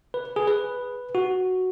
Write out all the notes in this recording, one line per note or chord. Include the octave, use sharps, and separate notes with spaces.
B4
G#4
B4
F#4